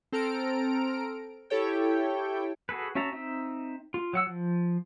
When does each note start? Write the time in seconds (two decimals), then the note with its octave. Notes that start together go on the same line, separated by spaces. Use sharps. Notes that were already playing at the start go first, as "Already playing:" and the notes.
0.12 C4 A4 A#5 F6 D7
1.50 E4 G4 A4 C#5 G5
2.69 F#4 G#4 A4 B4
2.95 C#4 F#4 E5 A5 A#5
3.12 C4 D#4 E5
3.94 F4
4.13 F#3 F#5 E6
4.27 F3